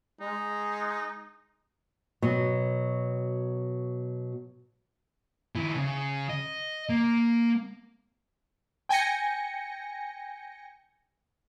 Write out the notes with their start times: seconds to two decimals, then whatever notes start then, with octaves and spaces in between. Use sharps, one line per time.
0.20 G#3 D#4
2.22 B2 F#3
5.55 D#3 E4
5.76 C#3
6.29 D#5
6.89 A#3
8.89 G5 G#5 G6 A#6 C#7